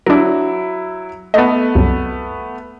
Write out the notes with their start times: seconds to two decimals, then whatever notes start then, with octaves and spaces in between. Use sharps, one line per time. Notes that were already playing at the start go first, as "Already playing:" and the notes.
0.06 F#3 D4 E4 A#4
1.34 A3 B3 A4 D#5
1.75 C2 F#2